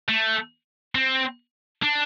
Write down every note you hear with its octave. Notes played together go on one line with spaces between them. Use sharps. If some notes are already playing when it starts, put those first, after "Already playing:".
A3
C4
D4